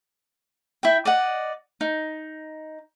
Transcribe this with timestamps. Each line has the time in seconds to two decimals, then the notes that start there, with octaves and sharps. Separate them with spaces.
0.83 E4 E5 G5
1.05 D5 D#5 F#5
1.81 D#4